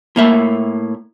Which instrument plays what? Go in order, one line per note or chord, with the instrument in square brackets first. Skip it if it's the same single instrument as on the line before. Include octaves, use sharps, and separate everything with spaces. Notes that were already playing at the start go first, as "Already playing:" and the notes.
[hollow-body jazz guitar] A2 A#3 E5